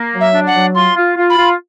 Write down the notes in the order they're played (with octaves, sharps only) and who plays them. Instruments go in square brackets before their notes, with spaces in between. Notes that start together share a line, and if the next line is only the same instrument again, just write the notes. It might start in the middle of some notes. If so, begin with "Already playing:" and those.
Already playing: [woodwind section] A#3
F#3
[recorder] E5
[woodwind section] D4
[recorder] F#5
[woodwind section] F#3
[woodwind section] F4 [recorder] C6
[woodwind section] F4
F4
[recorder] B5
[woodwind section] F4